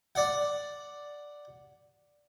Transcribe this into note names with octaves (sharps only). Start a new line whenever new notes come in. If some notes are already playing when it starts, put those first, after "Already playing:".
D5 F#5